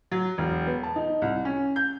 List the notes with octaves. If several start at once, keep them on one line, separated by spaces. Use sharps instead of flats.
F#3
E1
B3
A5
D#4
C2
C#4
G6